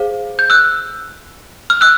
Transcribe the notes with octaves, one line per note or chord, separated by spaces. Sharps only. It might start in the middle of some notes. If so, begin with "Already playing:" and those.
Already playing: G#4 C5 F5
G6
E6 F#6
F6
E6 F#6